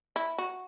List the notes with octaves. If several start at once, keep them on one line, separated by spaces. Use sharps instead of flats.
E4
F#4